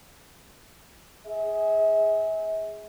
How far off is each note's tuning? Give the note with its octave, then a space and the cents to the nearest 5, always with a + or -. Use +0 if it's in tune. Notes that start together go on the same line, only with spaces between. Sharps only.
G#4 +0 E5 -40